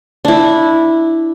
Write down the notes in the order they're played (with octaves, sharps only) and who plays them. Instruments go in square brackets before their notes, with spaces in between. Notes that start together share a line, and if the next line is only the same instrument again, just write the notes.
[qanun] D4 E4